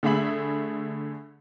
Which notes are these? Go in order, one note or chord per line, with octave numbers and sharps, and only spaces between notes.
D3 A3 G#4 E5 B5 F#7